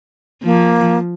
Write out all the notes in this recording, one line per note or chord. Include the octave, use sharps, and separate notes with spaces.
F3 A#3